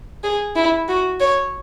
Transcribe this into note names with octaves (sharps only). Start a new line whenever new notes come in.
G#4
E4
F#4
C#5